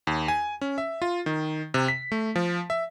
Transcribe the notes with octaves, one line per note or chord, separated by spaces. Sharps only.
D#2
G#5
C#4
E5
F4
D#3
C3
B6
A3
F3
E5